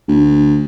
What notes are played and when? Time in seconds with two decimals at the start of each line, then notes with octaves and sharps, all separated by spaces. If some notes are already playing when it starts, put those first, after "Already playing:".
0.08 D2